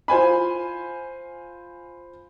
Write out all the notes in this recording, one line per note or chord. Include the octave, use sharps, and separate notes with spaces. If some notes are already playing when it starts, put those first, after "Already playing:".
F4 C5 G#5 B5